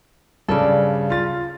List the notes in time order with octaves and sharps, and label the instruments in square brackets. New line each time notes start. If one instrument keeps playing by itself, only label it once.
[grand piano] G2 C#3 [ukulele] A4 D5
[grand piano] F4 A6